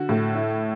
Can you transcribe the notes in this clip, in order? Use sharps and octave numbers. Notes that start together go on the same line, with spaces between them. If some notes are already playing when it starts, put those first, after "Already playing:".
Already playing: D3 F#4
A2
E4